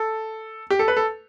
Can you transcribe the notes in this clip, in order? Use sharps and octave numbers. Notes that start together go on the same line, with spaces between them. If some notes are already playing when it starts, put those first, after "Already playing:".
Already playing: A4
G4
A4
B4
A4